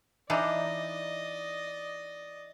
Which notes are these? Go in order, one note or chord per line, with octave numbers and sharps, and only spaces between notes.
E3 D4 D#4 D5 D#5